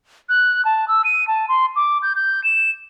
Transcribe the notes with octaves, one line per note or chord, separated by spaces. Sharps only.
F#6
A5
E6
D#7
A5
C6
D6
G6
G6
E7